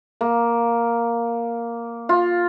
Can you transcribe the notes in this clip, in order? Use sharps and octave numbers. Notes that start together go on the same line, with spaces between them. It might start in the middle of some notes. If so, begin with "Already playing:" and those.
A#3
F4